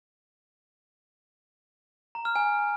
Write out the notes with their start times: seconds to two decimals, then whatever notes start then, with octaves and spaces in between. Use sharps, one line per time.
2.15 A#5
2.25 F6
2.36 G#5